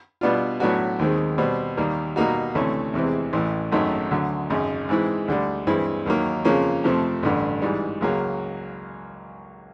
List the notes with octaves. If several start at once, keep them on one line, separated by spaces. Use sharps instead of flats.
B2 G3 B3 D4 F4
A2 F#3 B3 D4 F#4
D#2 D#3 G#3 C4
B2 G3 C4
D#2 D#3 G3 A#3
B2 G3 A#3 D#4 F#4
D2 C3 E3 A3 C#4
E2 C3 E3 G#3 C4
A1 A2 E3
G#1 F#2 D#3 F#3 A3
D2 D3 F#3
G#1 F#2 C#3
G#2 E3 G#3 C4 E4
D2 D3 G3
G2 E3 G#3 C4 E4
D#2 D#3 F#3 A#3
F2 C#3 F3 A#3 C#4
F2 C3 F3 A3 C4
A1 G2 D3
G#2 E3 G3
C#2 C#3 F#3 A#3